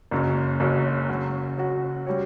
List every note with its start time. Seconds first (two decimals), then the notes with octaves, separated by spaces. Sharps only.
0.11 F#1 F#2 C#3
0.60 F#1 F#2 C#3
1.09 C#3 F#3 C#4 F#4
1.58 C#3 F#3 C#4 F#4
2.07 G3 C#4 F#4 C#5